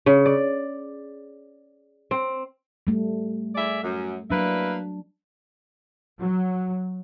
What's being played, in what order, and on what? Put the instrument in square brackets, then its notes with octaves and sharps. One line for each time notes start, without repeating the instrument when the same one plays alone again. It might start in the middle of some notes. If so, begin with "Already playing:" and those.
[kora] C#3
D5
C4
[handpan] G3 A3
[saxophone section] G#4 D5 E5
F#2
[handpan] F#3 D4 [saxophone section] A#3 E4 B4
[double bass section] F#3